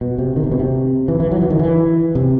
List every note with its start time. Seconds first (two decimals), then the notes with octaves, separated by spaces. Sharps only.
0.01 B2
0.18 C3
0.36 D#3
0.44 C3
0.52 B2
0.59 C3
1.08 E3
1.20 E3
1.32 F#3
1.42 E3
1.50 D#3
1.59 E3
2.15 C3